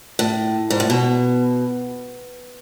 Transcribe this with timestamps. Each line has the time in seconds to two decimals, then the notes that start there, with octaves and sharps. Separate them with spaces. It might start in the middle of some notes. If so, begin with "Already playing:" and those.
0.19 A2
0.70 G#2
0.80 A2
0.90 B2